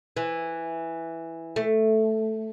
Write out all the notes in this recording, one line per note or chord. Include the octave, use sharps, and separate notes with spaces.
E3
A3